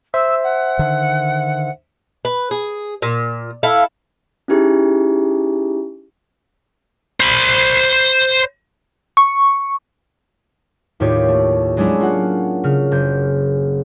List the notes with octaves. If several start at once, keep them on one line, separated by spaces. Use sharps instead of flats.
C5 E5 E6
F#5
D3 D#3
B4
G#4
A#2
E4 A4 F5
C#4 D#4 E4 G4 G#4
C5 B5
C#6
D#2 A2 F4 G4 C#5
A3
F#3 G#3 C#4 D4 E4
A#3 F4 F#5
C#3 F6
F#1 G6